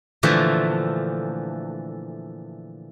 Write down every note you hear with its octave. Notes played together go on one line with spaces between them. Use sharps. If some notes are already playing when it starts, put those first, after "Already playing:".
A#2 D3 E3 F3 A3